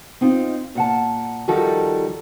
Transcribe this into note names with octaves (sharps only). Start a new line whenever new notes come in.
C4 D#4 F4
A#2 F#5 A5
D#3 F3 G3 F#4 A4 A#4